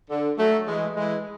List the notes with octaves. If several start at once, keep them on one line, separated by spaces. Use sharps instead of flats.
D3
F#3 A3
E3 G#3
E3 G#3